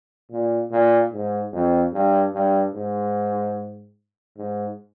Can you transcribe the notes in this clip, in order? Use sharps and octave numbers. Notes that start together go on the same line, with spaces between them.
A#2
A#2
G#2
F2
G2
G2
G#2
G#2